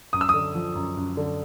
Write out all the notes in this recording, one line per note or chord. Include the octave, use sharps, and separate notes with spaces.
F#2 D#6
E6
D3 D#6
F3
F#2
F#2
D3